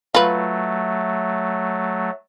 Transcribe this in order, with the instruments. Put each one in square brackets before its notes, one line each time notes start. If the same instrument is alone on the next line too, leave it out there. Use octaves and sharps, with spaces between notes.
[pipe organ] F#3 A3 [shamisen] F4 B4